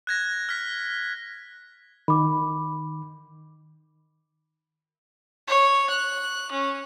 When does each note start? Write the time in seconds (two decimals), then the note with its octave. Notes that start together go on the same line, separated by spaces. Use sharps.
0.07 F#6 G#6 A#6
0.49 F6 B6
2.08 D#3 B5 D6
5.47 C#5
5.89 F#6
6.51 C#4